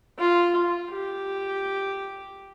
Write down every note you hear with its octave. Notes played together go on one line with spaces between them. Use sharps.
F4
G4